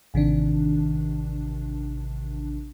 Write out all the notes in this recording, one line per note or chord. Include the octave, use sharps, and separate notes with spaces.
A1 C3 D#3 D4